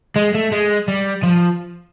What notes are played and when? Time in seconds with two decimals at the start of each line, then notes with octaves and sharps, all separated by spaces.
0.16 G#3
0.34 A3
0.52 G#3
0.88 G3
1.23 F3